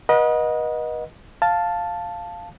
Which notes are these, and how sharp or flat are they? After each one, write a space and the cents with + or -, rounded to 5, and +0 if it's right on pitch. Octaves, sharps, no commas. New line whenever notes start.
B4 -40 D#5 +0 F#5 -25
F5 +0 A5 +0